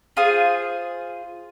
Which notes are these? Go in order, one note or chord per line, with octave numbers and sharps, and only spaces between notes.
F4 G#4 C5 D#6